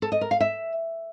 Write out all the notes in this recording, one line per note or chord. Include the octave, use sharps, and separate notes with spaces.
A4
D#5
A#4
F5
E5